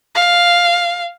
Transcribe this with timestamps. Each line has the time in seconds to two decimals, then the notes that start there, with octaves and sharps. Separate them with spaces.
0.15 F5